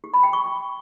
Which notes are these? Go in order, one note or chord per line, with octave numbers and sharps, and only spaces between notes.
G4
B5
G5
C#6